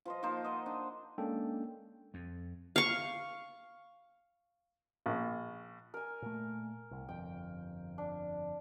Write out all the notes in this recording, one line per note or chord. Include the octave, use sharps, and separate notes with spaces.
F3 C5 D#5
F3 A#3 D#4 C5
D#5 F#5
D4
G#3 A#3 C#4 D4 A4 G5
F2
F5 C#6
A#1
A#4 G#5
A#2 A3
C2
G1 F2 G5
D4